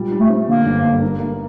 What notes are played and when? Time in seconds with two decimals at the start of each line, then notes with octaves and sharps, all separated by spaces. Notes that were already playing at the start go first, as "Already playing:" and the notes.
Already playing: A#2 G3
0.12 G3
0.20 A3
0.29 C4
0.48 D3 A#3
0.66 G1
0.83 G2
1.02 A#3
1.20 A#3